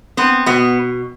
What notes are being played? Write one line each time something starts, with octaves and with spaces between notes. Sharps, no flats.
B3 C4
B2 B3